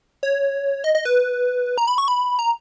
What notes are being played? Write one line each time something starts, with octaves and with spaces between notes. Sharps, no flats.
C#5
D#5
D#5
B4
A#5
B5
C#6
B5
A#5